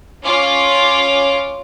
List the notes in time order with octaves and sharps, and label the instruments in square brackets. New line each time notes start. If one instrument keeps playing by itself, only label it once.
[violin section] C#4 F4 D6